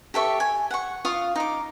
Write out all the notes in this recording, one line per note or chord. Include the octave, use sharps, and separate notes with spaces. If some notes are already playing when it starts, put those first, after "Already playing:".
G4 A4 E5 C#6
G#5
F#5 C#6
F4 F5 C#6 D#6
D#4 D6